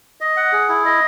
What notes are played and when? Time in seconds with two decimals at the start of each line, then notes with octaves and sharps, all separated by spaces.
0.21 D#5
0.37 F#5
0.52 G#4
0.69 E4
0.85 D#5